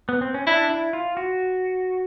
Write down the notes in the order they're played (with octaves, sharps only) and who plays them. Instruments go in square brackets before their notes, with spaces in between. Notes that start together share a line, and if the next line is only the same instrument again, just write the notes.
[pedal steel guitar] B3
C4
C#4
[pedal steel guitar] D4 [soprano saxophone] E4
[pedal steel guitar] E4
F4
F#4